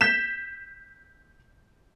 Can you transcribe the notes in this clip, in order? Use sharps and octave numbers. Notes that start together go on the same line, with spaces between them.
G6 B6 E7